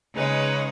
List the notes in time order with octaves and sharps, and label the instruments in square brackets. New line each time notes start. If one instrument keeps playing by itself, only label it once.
[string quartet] C#3 G#3 D#4 [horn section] G#4 B4